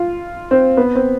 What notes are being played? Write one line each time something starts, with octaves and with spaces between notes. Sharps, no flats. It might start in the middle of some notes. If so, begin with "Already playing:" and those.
Already playing: F4
C4
B3
C4